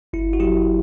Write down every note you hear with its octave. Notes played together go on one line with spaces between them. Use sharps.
G1 E4
F#4
F#3 E4 G4